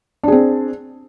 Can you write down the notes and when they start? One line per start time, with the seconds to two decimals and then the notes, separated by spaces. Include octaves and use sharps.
0.23 D4
0.28 G#4
0.32 C4